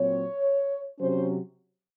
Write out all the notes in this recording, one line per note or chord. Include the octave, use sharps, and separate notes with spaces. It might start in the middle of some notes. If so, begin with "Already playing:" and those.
Already playing: A#2 F#3 C4 C#5
C3 F#3 C#4 C5